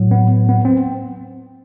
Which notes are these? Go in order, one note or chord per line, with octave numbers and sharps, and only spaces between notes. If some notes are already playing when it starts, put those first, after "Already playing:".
Already playing: A2 F#3
B3
B3
C4